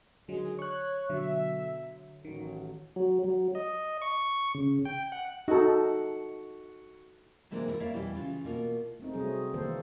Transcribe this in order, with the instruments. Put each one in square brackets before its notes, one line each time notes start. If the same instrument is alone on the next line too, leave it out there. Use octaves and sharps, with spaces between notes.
[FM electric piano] D3 F#3 [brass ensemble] D#3 G#3
[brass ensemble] C#5 [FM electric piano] C#6 F#6
[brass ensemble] B2 E5 [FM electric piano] D3 F#3
[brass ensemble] A1 F#3 [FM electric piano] D#3
[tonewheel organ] F#3
F#3
D#5
C#6
C#3
G5
F#5
[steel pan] D#4 A4 [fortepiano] F#4
[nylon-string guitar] C3 E3 G#3 A#3 D4 F4
E4 F4 A#4
A#3 E4 C#5 D5 E5 F5
E2 B2 E3 G3
C#3 E3 F4
B2 A#3 F4
[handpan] A3 C4 D#4
C3 F#3 G3 A3 C4 G#4
D#3 E3 A3 A#3 A4 C5